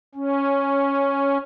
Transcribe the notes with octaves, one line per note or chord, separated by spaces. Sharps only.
C#4